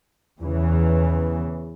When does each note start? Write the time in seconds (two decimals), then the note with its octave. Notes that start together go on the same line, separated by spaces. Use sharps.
0.41 E2 C#3 E3